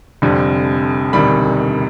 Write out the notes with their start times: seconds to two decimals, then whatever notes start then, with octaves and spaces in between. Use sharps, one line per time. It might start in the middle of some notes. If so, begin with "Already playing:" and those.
0.22 F1 F2 D3 G3 C4
1.13 E1 D2 C3 D#3 G3 B5